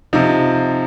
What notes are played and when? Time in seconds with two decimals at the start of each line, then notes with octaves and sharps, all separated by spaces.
0.13 C3 F3 D#4